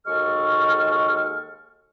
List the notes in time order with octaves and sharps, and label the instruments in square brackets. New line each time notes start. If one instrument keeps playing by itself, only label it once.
[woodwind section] D#2 G#3 F#4 A4 C#6 F6